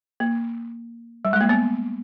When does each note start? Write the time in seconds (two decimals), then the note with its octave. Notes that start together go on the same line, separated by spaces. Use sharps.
0.20 A#3
1.25 G3
1.33 G#3
1.41 A#3
1.49 B3